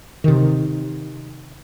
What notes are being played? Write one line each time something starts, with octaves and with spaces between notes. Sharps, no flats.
C3 D#3